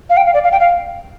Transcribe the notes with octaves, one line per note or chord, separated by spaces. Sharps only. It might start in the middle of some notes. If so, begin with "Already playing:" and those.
F5
G5
F5
D5
F5
G5
F5